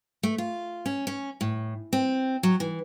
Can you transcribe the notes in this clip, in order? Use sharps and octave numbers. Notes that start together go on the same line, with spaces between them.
A3
F4
C#4
C#4
A2
C4
F#3
E3